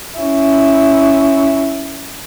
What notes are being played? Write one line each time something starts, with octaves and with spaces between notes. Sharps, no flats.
C#4 E4